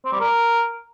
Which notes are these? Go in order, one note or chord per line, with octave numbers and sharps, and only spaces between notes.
C4
G3
A#4